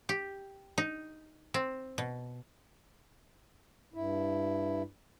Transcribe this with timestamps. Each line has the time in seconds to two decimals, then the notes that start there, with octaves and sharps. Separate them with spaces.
0.09 G4
0.78 D#4
1.54 C4
1.98 B2
3.94 G2 E4